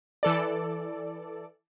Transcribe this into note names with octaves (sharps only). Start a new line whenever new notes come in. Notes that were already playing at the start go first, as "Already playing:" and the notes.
E3 A4 D5